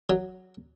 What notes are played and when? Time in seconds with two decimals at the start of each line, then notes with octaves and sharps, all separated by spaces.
0.10 F#3